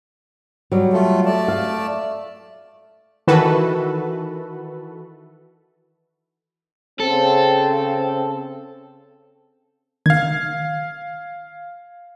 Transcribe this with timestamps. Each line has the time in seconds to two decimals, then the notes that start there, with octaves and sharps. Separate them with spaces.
0.72 F#3 G3
0.93 A3 F4 A4
1.26 A3 D5 A5
1.48 F5
3.28 D#3 E3 F#4 A4 B4
7.00 C#3 C4 A4
10.06 D#3 F5 G#6